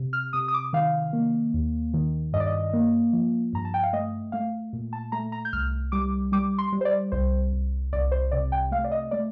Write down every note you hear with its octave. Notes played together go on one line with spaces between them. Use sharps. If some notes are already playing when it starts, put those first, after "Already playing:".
Already playing: C3
F6
C3 D#6
D#6
D6
D#3 F5
A#3
D#2
D#3
G2 D#5
D5
D#5
A#3
F3
G2 A#5
A5
G5
F5
A3 D#5
A3 F5
A#2
A5
A3 A#5
A#5
G6
C2 F6
G3 D6
G3 D6
C6
G3
C5
D5
C2 C5
C2
C2 D5
C5
C3 D5
G5
A3 F5
D5
D#5
A3 D5